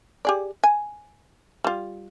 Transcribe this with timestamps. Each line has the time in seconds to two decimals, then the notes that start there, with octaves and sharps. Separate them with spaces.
0.25 G4 G#4 D5
0.64 G#5
1.64 G3 F4